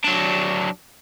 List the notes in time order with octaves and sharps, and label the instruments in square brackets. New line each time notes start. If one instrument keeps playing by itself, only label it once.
[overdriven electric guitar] F#3 D4